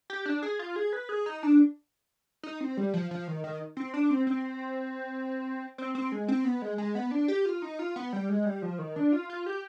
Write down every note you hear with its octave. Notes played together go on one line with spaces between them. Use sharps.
G4
D4
G#4
F4
G#4
B4
G#4
D#4
D4
D#4
C4
G3
F3
F3
D#3
D#3
C4
D4
C4
C4
C4
C4
G#3
C4
B3
G#3
G#3
B3
D4
G4
F4
D#4
F4
B3
G3
G#3
G3
F3
D#3
D4
F4
F4
G4